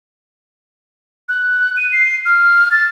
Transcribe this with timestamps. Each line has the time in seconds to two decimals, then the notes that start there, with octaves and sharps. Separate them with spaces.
1.29 F#6
1.77 D#7
1.92 C7
2.26 F6
2.71 A6